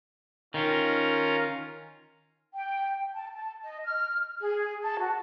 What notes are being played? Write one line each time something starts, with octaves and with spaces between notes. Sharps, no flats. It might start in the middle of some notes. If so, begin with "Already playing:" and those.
D#3 C#4 F4 A#4
G5
A5
A5
D#5
F6
G#4
A5
F#4